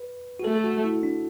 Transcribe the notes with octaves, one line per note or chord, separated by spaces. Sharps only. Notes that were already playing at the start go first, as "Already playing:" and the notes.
Already playing: B4
F#4
A3 A4
A4
F#4
E4
D4